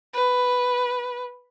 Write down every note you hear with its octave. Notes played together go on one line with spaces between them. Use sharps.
B4